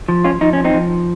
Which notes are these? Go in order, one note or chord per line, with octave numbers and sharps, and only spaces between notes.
F3
C#4 F4
F3 D#4
C#4
C4 D#4
F3